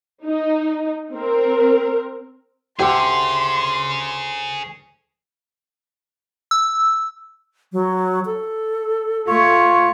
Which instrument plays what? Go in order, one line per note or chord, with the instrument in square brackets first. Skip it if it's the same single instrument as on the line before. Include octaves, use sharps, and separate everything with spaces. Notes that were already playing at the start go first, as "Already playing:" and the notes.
[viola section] D#4
C4 A#4
[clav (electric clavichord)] D2 D3 [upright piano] G4 [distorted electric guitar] G#4 C#5 [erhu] C6
[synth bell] E6
[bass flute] F#3
A4
[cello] A3 C#5 [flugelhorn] F4 [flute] C#6